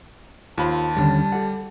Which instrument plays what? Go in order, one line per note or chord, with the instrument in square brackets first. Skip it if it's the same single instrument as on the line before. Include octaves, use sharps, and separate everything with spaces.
[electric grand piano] D#2 B5 [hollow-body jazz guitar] F4 C5 [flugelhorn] A5
[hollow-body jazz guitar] D#2 D3 C#4 [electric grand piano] G3
[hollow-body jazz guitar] G4 A4 F#5